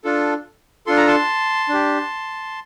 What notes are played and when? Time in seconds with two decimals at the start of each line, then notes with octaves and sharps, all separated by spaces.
0.04 D4 F4 A4
0.87 D4 F4 A4 C6
0.97 A#5
1.07 A5 C6
1.69 D4 G4